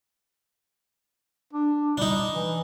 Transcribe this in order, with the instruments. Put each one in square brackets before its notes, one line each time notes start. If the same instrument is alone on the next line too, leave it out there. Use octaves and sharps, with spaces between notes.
[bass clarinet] D4
[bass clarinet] G3 [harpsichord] D4 D#4
[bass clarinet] E3